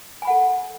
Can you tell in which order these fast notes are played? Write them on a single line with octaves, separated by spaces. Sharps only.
G#5 B5 F#5 A4